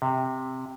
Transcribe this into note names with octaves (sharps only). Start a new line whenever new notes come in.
C3